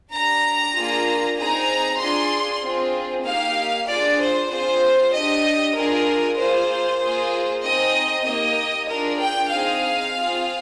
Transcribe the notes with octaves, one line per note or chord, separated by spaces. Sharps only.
D4 G4 A#5
A#3 D4 F4 G#4
C4 D#4 G#4 A#5
D4 F4 G#4 C6
C4 F4 G#4
A#3 D#4 G4 F5
D4 F4 G#4 D5
C5
C4 F4 G#4 C5
D4 G4 D#5
D4 F4 G#4 A#4
A#3 F4 G#4 C5
A#3 F4 G#4
C4 D#4 G#4 D#5
A#3 D#4 G4 D#5
D4 F4 G#4 A#4
G5
C4 D#4 G#4 F5
C4 F4 G#4